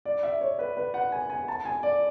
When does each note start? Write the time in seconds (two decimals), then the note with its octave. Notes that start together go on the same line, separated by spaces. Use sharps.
0.05 D5
0.23 E5
0.41 C#5
0.59 B4
0.77 B4
0.94 F#5
1.12 G#5
1.30 G#5
1.48 A5
1.65 G#5
1.83 D5